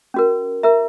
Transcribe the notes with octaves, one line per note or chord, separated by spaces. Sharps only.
C#4 F#4 A#4
A#4 E5 A#5